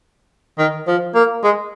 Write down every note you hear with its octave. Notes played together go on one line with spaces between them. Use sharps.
D#3
F3
A#3
G#3